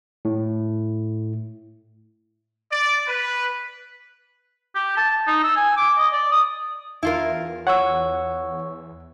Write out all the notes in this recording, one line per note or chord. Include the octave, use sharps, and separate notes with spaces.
A2
D5
B4
G4
A5
D#4
E6
G#5
D6
D#5
D5
D#6
E2 E4 F4 A#4
C#5 F#5 C#6 E6